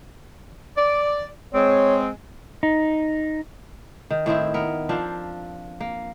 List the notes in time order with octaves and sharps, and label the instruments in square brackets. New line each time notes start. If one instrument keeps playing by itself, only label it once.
[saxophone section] D5
[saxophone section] G#3 C4 [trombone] C#5
[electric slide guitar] D#4
[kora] D#3
A2 D#3 C4 E4
B3 A#4
F3 C4 D4 F4
A#3